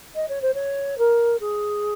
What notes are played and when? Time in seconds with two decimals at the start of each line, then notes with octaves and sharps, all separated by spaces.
0.15 D#5
0.28 C#5
0.42 C5
0.54 C#5
0.98 A#4
1.40 G#4